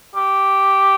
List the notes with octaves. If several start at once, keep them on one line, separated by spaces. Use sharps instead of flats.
G4